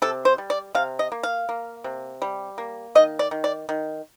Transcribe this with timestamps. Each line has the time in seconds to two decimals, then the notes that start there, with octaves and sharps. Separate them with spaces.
0.02 C3 A4
0.25 C5
0.38 G3
0.50 D5
0.75 C3 F5
0.99 D#5
1.12 A#3
1.23 F5
1.49 A#3
1.84 C3
2.22 G3
2.58 A#3
2.95 D#3 D#5
3.19 D5
3.31 D#3
3.44 D5
3.69 D#3